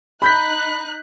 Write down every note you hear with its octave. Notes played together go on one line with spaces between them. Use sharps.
D#4 B5 F#6 G6 B6